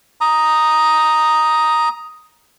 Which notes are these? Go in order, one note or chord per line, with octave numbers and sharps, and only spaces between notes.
A#5 D#6